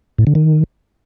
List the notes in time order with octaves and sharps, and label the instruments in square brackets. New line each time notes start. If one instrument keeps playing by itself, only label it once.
[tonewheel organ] A2
D3
D#3